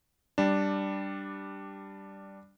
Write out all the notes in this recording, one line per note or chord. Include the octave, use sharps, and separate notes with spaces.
G3 D4